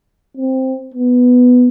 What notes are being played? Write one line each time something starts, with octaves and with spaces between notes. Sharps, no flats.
C4
B3